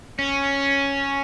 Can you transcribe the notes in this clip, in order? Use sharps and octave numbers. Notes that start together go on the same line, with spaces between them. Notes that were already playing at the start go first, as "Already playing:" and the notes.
C#4